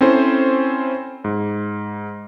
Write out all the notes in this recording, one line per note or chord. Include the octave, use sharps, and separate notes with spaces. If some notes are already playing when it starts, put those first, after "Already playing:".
C4 C#4 E4 A4 C5
G#2